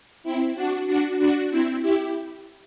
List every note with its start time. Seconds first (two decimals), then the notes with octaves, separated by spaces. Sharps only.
0.24 C4 E4
0.55 D4 F#4
0.87 D4 F#4
1.19 D4 F#4
1.50 C4 E4
1.82 E4 G4